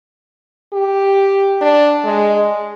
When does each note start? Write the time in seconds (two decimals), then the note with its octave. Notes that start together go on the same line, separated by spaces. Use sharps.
0.73 G4
1.61 D4
2.05 G#3